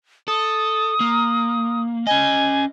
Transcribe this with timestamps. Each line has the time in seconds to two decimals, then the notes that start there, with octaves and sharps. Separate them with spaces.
0.28 A4 D#6
1.00 A#3
2.07 C#4 D#5 G#5